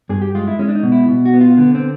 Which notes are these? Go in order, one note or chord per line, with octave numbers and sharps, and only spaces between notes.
G2 G#4
G4
G#3 F4
E4
G#3 C#4
D4
D#4
B2
E4
B2
F#4
B3
F4
D3 B3
C4